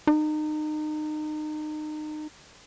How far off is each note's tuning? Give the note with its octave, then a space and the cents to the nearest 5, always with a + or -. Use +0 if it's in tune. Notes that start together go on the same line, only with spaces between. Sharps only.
D#4 -30